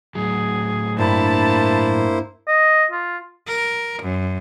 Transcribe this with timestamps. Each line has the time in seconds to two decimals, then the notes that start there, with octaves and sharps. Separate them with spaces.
0.15 A2 F#3 G#4
0.98 G2 A#3 E4 C5 A5 B5
2.48 D#5
2.91 F4
3.47 A#4
4.02 F#2